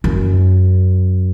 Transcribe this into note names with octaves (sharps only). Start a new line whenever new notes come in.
F#2